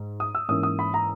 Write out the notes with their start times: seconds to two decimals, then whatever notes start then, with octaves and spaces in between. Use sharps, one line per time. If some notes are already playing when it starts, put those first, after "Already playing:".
Already playing: G#2
0.20 D#6
0.35 E6
0.49 G#2 E3 A#3 C#4 D#6
0.63 D#6
0.79 B5
0.94 A#5